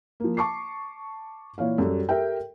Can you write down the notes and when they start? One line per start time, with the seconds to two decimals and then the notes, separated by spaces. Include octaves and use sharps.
0.20 F3 A#3
0.37 A5 C#6 D6 C7
1.58 A#2 E3 C#5 F5
1.78 F#2 G3 F#4 A4
2.09 G4 A4 A#4 E5 G5